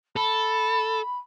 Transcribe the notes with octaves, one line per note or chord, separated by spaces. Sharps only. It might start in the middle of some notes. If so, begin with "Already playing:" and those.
A4 B5